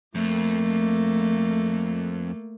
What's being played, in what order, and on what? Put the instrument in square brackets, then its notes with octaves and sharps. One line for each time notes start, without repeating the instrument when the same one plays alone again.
[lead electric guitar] F2 [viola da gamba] A3 A#3